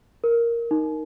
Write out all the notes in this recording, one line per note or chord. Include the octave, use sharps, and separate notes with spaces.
A#4
D#4